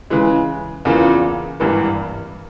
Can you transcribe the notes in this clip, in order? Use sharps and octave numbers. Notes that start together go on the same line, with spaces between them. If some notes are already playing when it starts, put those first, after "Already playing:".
C#3 E3 G#3
E2 C#3 E3 A#3 F4
G#1 G2 E3 A#3